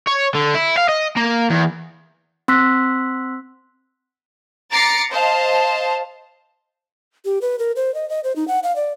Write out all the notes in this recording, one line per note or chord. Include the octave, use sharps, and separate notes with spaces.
C#5
D3
E4
F5
D#5
A#3
E2
C4 C6 E6 F#6 B6
A#5 D6 A6 C7 C#7
C5 D#5 F5 A5
G4
B4
A#4
C5
D#5
D#5
C5
D#4
F#5
F5
D5